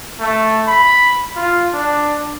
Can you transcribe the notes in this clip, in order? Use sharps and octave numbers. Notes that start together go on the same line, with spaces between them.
A3
B5
F4
D4